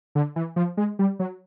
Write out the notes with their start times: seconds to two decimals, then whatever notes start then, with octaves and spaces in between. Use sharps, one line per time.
0.15 D3
0.36 E3
0.56 F3
0.77 G#3
0.99 G3
1.19 F#3